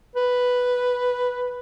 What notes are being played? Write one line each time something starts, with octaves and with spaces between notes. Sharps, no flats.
B4